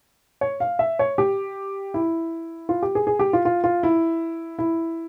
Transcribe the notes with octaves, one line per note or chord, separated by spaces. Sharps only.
C#5
F5
E5
C#5
G4
E4
F4
G4
G#4
G#4
G4
F4
F4
F4
E4
E4